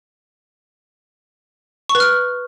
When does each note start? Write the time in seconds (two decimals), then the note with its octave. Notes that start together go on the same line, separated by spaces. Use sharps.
1.89 C#6
1.95 B4
2.00 F6